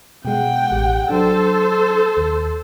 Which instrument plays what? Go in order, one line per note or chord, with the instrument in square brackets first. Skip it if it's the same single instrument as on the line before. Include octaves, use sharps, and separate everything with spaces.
[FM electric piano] B2 G#3 [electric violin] F#5 G5
[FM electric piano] A1 G4
[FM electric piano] F#3 D4 [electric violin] A4 C5
[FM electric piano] D#2